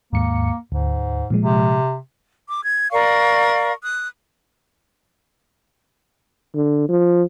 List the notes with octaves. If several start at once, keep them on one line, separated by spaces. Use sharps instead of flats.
D#2 G#2 A#3 C#7
D2 G#2
A#2 F3 G#3
C3
D6
G#6
A#4 D5 F5 C#6
D#6 F#6
D3
F3